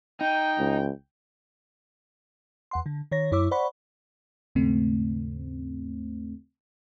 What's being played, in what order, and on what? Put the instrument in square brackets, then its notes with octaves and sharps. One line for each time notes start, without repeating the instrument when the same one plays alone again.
[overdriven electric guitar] D#4 [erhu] G5
[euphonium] C#2
[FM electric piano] E2 F#5 C6
D3
D#3 C#5 A#6
F#2 E4 C#5 D6 E6
C5 D5 F#5 B5 C#6
D#2 G#2 C#3 A3 C4